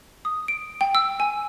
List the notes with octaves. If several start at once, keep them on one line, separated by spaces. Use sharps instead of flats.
D#6
D7
G5
E6
G#5